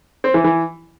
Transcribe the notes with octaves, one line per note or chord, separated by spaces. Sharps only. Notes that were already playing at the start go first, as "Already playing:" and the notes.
C4
E3
E3